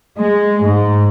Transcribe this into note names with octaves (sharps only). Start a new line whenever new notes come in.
G#3
G#2